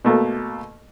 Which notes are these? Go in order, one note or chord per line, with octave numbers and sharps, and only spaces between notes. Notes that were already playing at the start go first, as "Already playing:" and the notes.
B2 A3 A#3